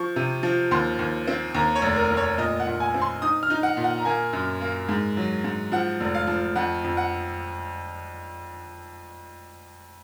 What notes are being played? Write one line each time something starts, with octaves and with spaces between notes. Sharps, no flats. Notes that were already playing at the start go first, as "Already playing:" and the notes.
Already playing: F3 C#6
C3
F3
D#2 C6
D#2
C4
D#2 A#5
C#5
F1
A#4
F1
C#5
A#2 D#5
F#5
A#2
G#5
C4
C6
D#4 D#6
F6
D#4
F#5
A#2
F#5
A#5
A#3 G#5
F#2
A#3
G#2
F#3
G#2
F3 F#5
F1
F5
F3
F2 F#5
F2
F#5